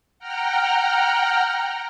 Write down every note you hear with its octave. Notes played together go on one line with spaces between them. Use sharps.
F#5 G5 A#5 F6